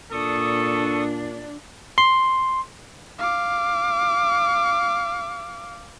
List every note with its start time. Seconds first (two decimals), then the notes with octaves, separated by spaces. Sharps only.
0.12 A#2 D4 A4 C#6 D#6
1.98 C6
3.19 F5 D6